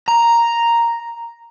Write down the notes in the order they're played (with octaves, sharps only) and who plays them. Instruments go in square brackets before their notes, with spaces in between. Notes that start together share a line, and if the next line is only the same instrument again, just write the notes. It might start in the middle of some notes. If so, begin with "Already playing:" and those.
[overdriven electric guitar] A#5